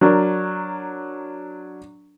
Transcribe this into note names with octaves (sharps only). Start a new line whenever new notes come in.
F#3 D4 A#4